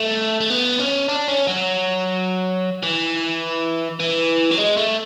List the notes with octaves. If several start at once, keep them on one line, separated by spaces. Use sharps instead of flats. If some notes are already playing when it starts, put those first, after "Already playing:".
Already playing: A3
A3
B3
C#4
D4
C#4
F#3
E3
E3
F#3
G#3
A3